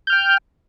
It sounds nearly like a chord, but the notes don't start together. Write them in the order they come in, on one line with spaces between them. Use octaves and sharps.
G6 F6 G5